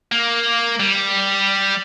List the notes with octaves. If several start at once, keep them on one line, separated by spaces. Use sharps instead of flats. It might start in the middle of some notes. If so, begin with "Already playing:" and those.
A#3
G3